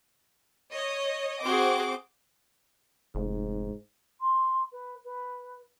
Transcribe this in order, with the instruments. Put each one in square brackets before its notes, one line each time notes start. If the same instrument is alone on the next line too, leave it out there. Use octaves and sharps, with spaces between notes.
[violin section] C#5 D#5
[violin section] C4 C5 D6 [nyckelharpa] F#4 G#4
[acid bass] F1 [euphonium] G#2
[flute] C6
B4
B4